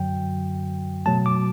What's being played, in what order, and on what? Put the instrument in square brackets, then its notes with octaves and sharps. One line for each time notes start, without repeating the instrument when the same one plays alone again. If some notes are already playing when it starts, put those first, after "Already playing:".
Already playing: [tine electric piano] F#2 D3 F#3 G5
B2 F#3 A3 A5
D6